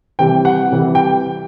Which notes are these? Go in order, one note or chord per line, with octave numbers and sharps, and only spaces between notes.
C3 E3 G3 G5
F#5
C3 E3 G3
G5